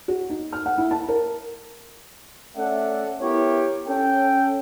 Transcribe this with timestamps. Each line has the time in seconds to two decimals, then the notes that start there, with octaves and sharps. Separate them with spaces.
0.08 F#4
0.30 D#4
0.53 F6
0.66 F#5
0.78 E4
0.91 A5
1.09 A#4
2.56 A3 C#4 A4 D5 E5 F#5
3.21 B3 E4 G4 A#4 C#5
3.88 C#4 A4 G5